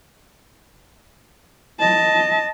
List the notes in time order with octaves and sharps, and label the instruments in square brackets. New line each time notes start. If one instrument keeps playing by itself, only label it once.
[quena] D#5 [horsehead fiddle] A5